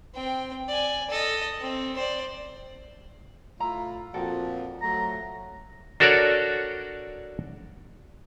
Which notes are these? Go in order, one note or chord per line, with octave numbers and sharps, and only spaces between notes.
C4 G5
D5 G#5
A4 D#5
C4
C5 D5
A2 E4 F4 A#5
F2 A#2 F3 F#4 A4 G5
F#3 A3 A#5
D4 F#4 A4 A#4 C#5 D5